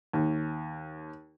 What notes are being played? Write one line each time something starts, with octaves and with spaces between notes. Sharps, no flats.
D#2